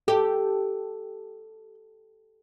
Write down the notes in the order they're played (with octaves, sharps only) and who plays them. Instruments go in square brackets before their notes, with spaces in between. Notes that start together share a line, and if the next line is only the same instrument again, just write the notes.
[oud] G4 [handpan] A4